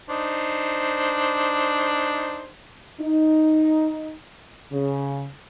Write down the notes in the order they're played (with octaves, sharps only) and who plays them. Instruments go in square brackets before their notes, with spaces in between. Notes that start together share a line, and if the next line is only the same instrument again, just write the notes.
[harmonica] D4 D#4 C5
[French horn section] D#4
C#3